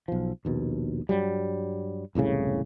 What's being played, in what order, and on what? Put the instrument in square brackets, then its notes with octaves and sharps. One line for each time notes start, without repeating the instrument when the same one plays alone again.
[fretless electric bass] B1 F3
A#1 D#2 B2
G2 F#3 G3
E1 C2 A2 C#3